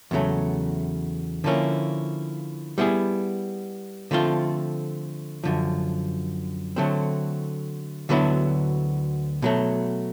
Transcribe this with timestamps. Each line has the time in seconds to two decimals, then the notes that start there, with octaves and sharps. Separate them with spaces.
0.11 E2 C#3 F#3 A3
1.44 D3 F3 A#3 C#4 E4
2.78 G3 B3 E4 G#4
4.11 D3 F3 A3 C4 F4
5.44 F#2 D3 F3
6.76 D3 F#3 A3 C4
8.09 D2 D3 F#3 B3 E4
9.42 B2 F#3 A3